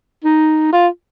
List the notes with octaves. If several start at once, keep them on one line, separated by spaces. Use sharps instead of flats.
D#4
F4